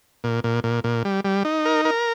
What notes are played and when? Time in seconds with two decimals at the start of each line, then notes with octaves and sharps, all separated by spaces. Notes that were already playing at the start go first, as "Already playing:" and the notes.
0.24 A#2
0.44 A#2
0.64 A#2
0.84 A#2
1.05 G3
1.24 G3
1.45 D#4
1.65 A#4
1.85 A#4